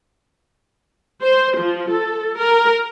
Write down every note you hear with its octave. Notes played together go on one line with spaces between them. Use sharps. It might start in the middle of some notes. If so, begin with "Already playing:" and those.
C5
F3
A4
A#4